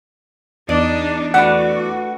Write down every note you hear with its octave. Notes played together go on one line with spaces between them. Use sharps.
E2 D4 D#4 D5 D#5
A3 D4 F#4 B4 F#5